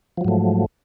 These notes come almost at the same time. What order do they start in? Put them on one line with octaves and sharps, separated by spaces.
F3 F#3 G#2 A3